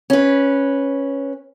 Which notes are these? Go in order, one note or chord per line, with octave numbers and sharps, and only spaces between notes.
C#4 B4